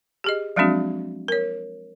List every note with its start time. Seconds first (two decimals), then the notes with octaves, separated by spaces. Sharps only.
0.24 G4 G#4 D#5
0.56 F3 F#3 G#3 C4 D4 F#4
1.28 A#4 C#5